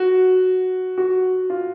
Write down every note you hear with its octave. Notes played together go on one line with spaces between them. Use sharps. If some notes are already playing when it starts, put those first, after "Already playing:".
Already playing: F#4
F#4
F4